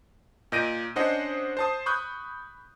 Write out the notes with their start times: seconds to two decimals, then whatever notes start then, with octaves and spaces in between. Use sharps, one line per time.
0.52 A#2 D#5 G6 A#6 D7 D#7
0.96 C#4 D4 C5 D#5 F#5
1.57 C5 A5 D#6
1.86 B5 C#6 D#6 F#6 G6